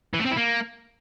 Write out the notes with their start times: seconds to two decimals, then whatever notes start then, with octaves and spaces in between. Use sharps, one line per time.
0.14 E3
0.19 A3
0.25 C4
0.31 E4
0.37 A#3